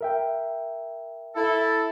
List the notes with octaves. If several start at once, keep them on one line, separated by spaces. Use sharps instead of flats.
A#4 E5 G5
E4 A4